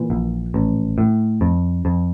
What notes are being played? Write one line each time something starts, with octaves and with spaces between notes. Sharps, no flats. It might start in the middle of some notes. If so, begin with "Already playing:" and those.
Already playing: A#2 E3
A#1
A1
A2
F2
F2